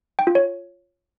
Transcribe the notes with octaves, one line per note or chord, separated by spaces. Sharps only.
G5
F4
C#5